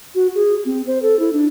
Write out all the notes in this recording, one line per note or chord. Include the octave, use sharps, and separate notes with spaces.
F#4
G#4
C4
C5
A4
E4
D4